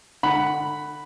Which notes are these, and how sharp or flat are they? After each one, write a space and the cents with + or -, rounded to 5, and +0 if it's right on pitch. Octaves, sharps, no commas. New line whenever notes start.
D3 +30 F#5 +10 B5 +0